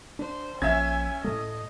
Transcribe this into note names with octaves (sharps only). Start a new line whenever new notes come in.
D4 C5
A#1 C#4 E5 G#5 G#6
A2 A3 D#5